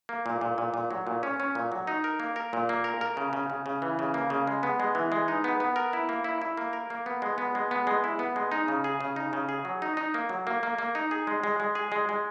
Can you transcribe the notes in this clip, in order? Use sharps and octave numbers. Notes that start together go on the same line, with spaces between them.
A#3
A#2
A#2
A#2
A#2
F#3
A#2
C#4
C#4
A#2
F#3
D#4
A#4
A#3
A#4
A#2
A#3
A#4
A#4
C#3
C#3
C#3
C#3
E3
C#3
A#3
C#3
G#3
B3
G#3
E3
G#3
D#4
B3
B3
A#4
E4
A#3
E4
E4
A#3
A#4
A#3
B3
G#3
B3
G#3
B3
G#3
E4
B3
G#3
D#4
C#3
G#4
C#3
D#4
C#3
G#4
F#3
D#4
D#4
A#3
F#3
A#3
A#3
A#3
D#4
G#4
G#3
G#3
G#3
G#4
G#3
G#3